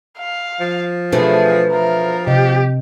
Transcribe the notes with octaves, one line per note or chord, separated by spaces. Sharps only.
F5
F3
B2 E3 A3 D4 G#4 B4 C5
F3 A#4
C3 G4 D#5